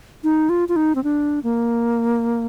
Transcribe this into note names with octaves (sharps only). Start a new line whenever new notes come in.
D#4
F4
F4
D#4
C4
D4
A#3